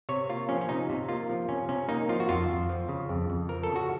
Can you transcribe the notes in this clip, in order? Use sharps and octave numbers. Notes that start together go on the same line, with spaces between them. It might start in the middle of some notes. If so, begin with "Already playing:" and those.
C3 C#5
A#3 F4
F3 C#4
C#4
C3 D#4
C3
A#3 F4
F3
C3 C#4
C3 C#4
A#3 D#4
F3 F4
F#4
F2 F4
F2
F3
C#3
F2
F2
F3 A#4
A4
C#3
F#4